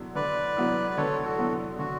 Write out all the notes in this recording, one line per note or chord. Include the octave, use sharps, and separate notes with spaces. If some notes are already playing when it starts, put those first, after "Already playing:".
Already playing: D3 F#3 B3 E4
D3 B4 D5
F#3 B3 E4
D5
D3 A4 C#5
F#4 A4
F#3 B3 E4
D3 F#4